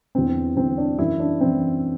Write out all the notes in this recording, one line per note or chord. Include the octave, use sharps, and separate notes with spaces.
E2 D3 C4
E2 D3 C4
D4
F#2 E3 E4
D4
F#2 E3 C4